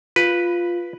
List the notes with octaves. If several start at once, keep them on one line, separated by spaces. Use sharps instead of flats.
F4 B4